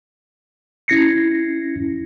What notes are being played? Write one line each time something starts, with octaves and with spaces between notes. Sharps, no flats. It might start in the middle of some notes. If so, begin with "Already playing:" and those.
C#4 E4 G#6 A#6 C7 C#7